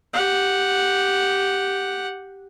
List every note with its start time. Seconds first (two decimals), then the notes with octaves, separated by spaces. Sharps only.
0.13 G4 F#5